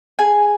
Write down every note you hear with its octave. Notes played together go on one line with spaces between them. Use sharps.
G#4 G#5